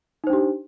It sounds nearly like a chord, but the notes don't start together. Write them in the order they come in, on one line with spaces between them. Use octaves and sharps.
D#4 C5 D4 G4